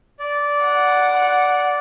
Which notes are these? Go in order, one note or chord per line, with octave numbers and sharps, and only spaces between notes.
D5
F#5